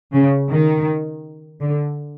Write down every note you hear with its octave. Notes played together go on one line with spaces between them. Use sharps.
C#3
D#3
D3